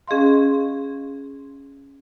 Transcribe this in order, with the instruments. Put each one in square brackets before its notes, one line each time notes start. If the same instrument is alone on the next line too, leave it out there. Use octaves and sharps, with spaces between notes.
[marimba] C#4 G#4 D#5 F5 C6